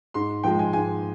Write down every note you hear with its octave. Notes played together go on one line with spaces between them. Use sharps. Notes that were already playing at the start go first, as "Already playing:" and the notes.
G#2 C6
F3 G#3 G5
G#5
G#2 G#5